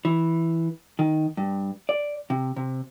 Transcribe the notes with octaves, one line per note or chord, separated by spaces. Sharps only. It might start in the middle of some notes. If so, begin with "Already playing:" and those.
E3
D#3
G2
D5
C3
C3